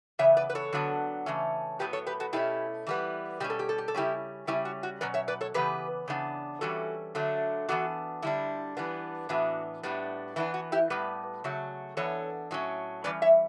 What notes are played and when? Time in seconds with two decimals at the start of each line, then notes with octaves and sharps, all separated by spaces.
0.19 C#3 E3 B3 C#5 E5
0.37 B4 D5
0.50 B4
0.55 A4 C#5
0.73 D3 F#3 B3 D4
1.26 C#3 E3 A3 C#4
1.79 A2 F#3 B3 G4 B4
1.93 A4 C#5
2.07 G4 B4
2.20 F#4 A4
2.33 B2 A3 C#4 E4 G4
2.87 E3 G3 B3
3.40 B2 G3 C#4 G4
3.50 A4
3.59 G4
3.69 A4
3.78 G4
3.88 A4
3.94 C#3 G3 C#4 E4 G4
4.47 C#3 G3 C#4 E4
4.65 F#4
4.83 F#4
5.01 B2 F#3 C#4 B4 D5
5.14 C#5 E5
5.28 B4 D5
5.41 A4 C#5
5.54 C#3 E3 B3 G4 B4
6.08 C#3 E3 B3 D4
6.61 E3 G3 C#4 F#4 A4
7.15 D3 F#3 A3 D4
7.69 E3 B3 D4 F#4 A4
8.22 D3 G3 D4 E4
8.77 E3 G3 B3 D4
9.29 A2 E3 B3 D4 F#4
9.83 A2 G3 B3 D4
10.36 E3 B3 D4 E4
10.54 F#4
10.72 E4 G4
10.90 A2 G3 B3 G4 B4
11.44 C#3 F#3 A3
11.97 E3 B3 D4 A4 C#5
12.51 A2 F#3 C#4
13.04 E3 G3 C#4 B4 D5
13.22 C#5 E5